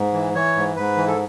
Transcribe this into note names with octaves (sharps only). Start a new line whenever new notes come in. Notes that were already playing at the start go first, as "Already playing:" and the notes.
Already playing: G#2
E3
E3 C#5
G#2
G#2 B4
E3
A4